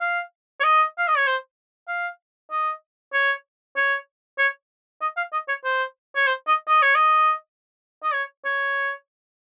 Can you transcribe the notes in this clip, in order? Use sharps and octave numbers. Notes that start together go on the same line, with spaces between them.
F5
C#5
D#5
F5
D#5
C#5
C5
F5
D#5
C#5
C#5
C#5
D#5
F5
D#5
C#5
C5
C#5
C5
D#5
D#5
C#5
D#5
D#5
C#5
C#5